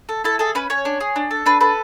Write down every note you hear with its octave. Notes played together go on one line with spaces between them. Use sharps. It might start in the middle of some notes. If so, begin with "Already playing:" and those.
A4
E4 A4
G#4 A4
C#4 B4
C#4 C#5
D4
G#4
D4
A4
D4 B4
A4 B4